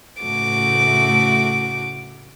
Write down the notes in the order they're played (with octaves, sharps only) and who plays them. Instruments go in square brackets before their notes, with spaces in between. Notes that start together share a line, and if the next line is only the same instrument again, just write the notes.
[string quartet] A2 C#3 A3 F#4 D6